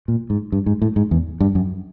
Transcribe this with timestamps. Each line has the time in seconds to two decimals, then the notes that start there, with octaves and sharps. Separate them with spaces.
0.08 A#2
0.30 G#2
0.52 G2
0.66 G#2
0.82 A2
0.96 G#2
1.11 E2
1.40 G2
1.55 F#2